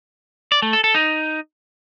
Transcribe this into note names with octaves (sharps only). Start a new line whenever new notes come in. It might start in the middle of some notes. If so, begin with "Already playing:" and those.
D5
A3
A4
A4
D#4